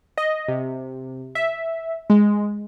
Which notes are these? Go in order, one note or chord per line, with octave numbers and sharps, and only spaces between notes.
D#5
C3
E5
G#3